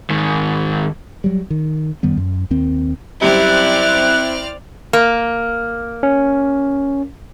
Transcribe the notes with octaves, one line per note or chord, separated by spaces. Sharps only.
G#2 D#3
F#3 G3
D#3
F#2 D#3 G3 B3
F#2
D#2 D#3 C4
F#2 G3 C4 E4 D5 F6 F#6
A#3
C#4